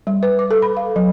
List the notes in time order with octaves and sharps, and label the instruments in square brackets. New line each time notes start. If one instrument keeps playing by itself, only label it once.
[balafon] G3
B4
D6
A4
B5
F5
F#3